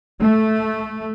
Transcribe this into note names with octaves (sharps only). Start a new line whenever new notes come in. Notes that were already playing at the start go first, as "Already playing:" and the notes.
A3